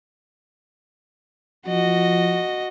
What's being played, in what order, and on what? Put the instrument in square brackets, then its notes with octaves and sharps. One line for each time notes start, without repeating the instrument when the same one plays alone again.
[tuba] F3 [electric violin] F#4 D#5